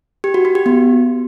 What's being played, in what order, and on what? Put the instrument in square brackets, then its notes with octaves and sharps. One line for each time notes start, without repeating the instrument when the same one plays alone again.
[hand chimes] G4
F#4
F#4
G4
B3